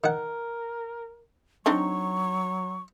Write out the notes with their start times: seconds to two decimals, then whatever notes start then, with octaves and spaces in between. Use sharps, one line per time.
0.04 D#3 A#4 F#5
1.66 F#3 C4 D4 D#4 C#6